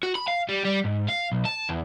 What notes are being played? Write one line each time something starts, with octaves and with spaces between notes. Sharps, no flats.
F#4
B5
F5
G3
G3
G#2
F5
B1
A5
E2